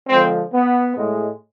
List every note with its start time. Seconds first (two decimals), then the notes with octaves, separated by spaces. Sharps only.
0.08 D3 F3 G#3 C4
0.53 B3
0.96 A2 G#3